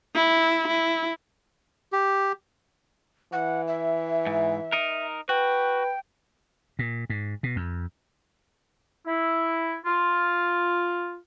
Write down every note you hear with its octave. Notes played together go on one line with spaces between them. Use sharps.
E4
E4
G4
E3 F#5
E5
G#2
D#4 A#4
F#4 B4 G5
A#2
G#2
B2
F2
E4
F4